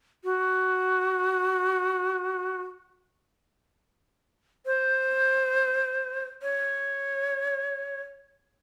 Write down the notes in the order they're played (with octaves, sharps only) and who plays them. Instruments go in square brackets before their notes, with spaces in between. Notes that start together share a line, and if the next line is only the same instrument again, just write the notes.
[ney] F#4
C5
C#5